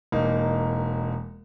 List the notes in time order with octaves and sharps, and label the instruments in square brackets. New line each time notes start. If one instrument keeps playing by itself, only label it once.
[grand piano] E1 A#3 D#4